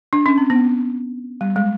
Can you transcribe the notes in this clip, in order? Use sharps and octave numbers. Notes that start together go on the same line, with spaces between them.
D4
C#4
C4
B3
G3
G#3